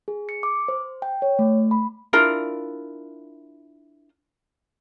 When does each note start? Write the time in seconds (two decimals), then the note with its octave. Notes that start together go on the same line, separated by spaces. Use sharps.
0.08 G#4
0.29 C#7
0.43 D6
0.68 C5
1.02 G5
1.22 C#5
1.39 A3
1.71 B5
2.13 D4 E4 F4 A#4